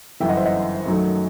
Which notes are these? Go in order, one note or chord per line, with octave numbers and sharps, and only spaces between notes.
G1 F#2 E3 E5 G5
D#5 F#5
C5 E5
D#5 F#5
F#2 D#3 F#3 A3